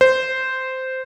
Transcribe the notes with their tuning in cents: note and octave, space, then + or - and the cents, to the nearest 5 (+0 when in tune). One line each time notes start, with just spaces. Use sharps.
C5 -10